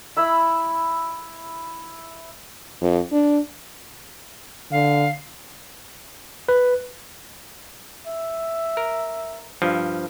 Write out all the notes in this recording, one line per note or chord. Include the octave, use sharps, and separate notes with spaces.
E4 B5 E6
F2
D4
D3 F5
B4
E5
A#4
G2 F3